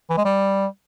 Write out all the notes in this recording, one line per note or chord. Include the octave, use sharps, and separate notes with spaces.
E3
G#3
G3